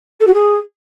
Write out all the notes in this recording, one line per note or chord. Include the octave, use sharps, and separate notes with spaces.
A4
F#4
G#4